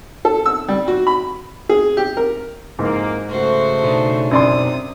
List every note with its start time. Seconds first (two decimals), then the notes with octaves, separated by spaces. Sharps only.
0.25 A4
0.46 E6
0.68 G3
0.88 F#4
1.07 B5
1.69 G#4
1.97 G4
2.17 A#4
2.79 F2 G#2 E3 A#3
3.30 C#3 A3 F#4 C5
3.83 B2 D4 D#4
4.31 F#2 C3 D5 C6 D#6